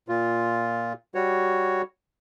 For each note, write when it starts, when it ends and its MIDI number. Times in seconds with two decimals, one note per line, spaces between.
0.08 0.93 46
0.08 0.93 65
1.15 1.82 55
1.15 1.82 66
1.15 1.82 73